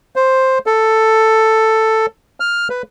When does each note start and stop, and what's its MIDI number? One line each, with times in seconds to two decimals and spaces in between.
0.16 0.58 72
0.66 2.06 69
2.40 2.68 89
2.70 2.82 71